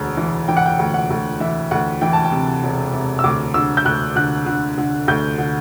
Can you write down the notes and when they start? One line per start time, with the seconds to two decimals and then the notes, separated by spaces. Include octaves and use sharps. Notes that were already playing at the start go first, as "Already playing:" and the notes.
Already playing: E1 D2
0.17 E3
0.48 E3 G5
0.57 F#5
0.66 G5
0.79 D2
0.94 F#5
1.10 D2
1.40 E3 E5
1.71 D2 F#5
2.01 E3 G5
2.13 A5
2.24 G5
2.32 C3
2.63 E1
2.93 C3
3.19 E6
3.24 D2 D6
3.54 D3 E6
3.77 G6
3.85 D2 F#6
4.16 D3 F#6
4.46 D3
4.78 D3
5.08 D2 G6
5.38 D3